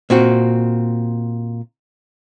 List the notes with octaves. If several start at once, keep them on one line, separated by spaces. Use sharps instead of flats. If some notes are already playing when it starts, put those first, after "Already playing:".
A#2 C4 F#4